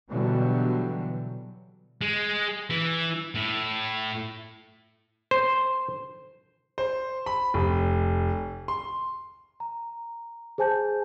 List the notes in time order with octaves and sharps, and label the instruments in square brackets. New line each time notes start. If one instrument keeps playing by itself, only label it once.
[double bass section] B2 D3 E3 F#3 G3
[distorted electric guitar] G#3
E3
A2
[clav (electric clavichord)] C5
[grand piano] C5
B5
F1
C6
[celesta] A#5
G#4 C5 G#5 A5 G6